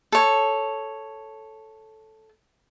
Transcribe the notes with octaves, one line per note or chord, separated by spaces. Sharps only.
A4 C#5